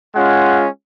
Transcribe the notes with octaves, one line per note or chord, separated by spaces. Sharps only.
G#3 C#4 F4 F#5